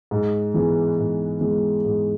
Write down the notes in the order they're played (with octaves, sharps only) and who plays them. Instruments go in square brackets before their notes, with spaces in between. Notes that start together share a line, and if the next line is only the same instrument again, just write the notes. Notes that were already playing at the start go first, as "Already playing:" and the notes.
[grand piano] G#2
E3 G#3 B3
G#2
E3 G#3 B3
G#2